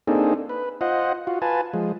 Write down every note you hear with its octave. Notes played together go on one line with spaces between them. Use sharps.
A#3 C4 D4 D#4 G#4 A4
B4
F4 C5 D#5 F#5
F4 F#4
F4 B4 G#5 A5
F3 G#3